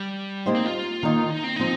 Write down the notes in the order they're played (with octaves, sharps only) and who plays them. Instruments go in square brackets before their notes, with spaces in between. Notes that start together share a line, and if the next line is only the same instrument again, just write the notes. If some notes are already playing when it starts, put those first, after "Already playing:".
Already playing: [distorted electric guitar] G3
[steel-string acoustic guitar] A#3 D#4 G4 C5
[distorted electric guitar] C4
F4
[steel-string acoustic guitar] D#3 A#3 D#4
[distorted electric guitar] D#4
C4
[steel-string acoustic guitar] F3 C4 [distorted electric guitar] D#4